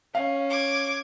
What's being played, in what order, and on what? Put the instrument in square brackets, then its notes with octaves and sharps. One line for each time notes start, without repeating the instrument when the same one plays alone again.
[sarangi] C#4 [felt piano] F5
[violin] D6 G#6